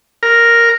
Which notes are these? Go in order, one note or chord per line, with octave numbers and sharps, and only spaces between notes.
A#4